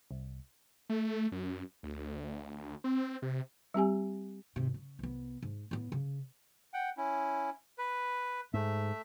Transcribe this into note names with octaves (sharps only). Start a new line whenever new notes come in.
C2
A3
F#2
D2
C4
C3
G3 C4 G4 G#5
G#1 C3
C#3
C2 B3
G#2
A2 B3
C#3
F#5 G5
C#4 E4
B4
G#2 A3 E5